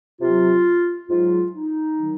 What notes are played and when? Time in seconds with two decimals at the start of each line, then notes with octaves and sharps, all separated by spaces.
0.21 C3 F#3 F4
1.08 G#2 F#3 F4
1.52 D#4
1.97 D#3 F#3